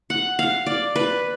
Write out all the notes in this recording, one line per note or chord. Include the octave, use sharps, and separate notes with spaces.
F#5
F5
D5
B4